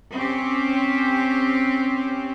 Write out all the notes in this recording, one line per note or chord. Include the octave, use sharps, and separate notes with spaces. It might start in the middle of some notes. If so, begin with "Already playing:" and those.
C4 C#4 G4